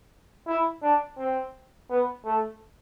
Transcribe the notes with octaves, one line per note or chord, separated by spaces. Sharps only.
E4
D4
C4
B3
A3